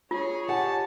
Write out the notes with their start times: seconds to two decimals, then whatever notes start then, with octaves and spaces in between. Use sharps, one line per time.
0.11 F4 G#4 C#5
0.48 G4 F#5 G#5 A5